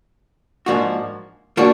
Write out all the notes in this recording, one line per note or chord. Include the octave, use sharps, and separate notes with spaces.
G#2 F3 A#3 D4 F#4
F3 A#3 D4 F#4